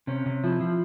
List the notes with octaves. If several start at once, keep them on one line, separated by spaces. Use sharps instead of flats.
C3 C#4
C3
F3 E4
F3